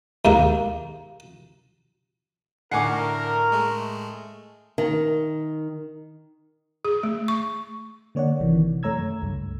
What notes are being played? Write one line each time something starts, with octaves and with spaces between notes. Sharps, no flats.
D#2 G#2 A#3
A2 D3 A3 A#4 F#5 G#5 D6 C7
G#3 A3
D#3
G#4
A3
C#6
D3 A#3 C#5 D5 F#5
A1 C3 D#3 E3
F#2 A3 C#5 A#5 E6 G#6
C#2 G2